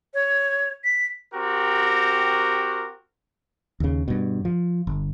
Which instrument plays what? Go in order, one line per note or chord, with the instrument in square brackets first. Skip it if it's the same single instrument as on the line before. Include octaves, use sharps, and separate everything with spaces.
[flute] C#5
B6
[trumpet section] C4 F#4 G4 A#4
[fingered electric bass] D#2 C#3
G2 B2
F3
G1